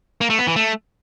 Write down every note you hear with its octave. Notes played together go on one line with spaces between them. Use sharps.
A#3
A3
B3
E3
A3